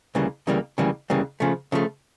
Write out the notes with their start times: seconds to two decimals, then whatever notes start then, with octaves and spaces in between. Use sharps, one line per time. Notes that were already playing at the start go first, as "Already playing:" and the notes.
0.15 D2 C#3 E3 G3 A#3
0.47 D2 C#3 E3 G3 A#3
0.78 D2 C#3 E3 G3 A#3
1.10 D2 C#3 E3 G3 A#3
1.40 C#3 F3 A3
1.72 C#3 F3 A3